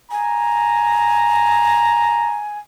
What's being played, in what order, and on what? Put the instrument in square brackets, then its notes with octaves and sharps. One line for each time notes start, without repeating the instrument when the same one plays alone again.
[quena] G#5 [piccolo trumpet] A#5